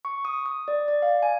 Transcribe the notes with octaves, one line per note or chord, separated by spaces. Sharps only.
C#6
D#6
D#6
D5
D5
F5
G#5